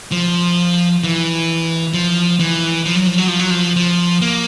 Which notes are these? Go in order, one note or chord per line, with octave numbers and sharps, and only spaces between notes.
F3
E3
F3
E3
F3
F#3
F3
F#3
F3
F#3
F3
F3
A#3